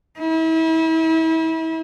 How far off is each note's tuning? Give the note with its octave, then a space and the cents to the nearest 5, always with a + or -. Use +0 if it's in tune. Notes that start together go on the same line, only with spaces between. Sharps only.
E4 -35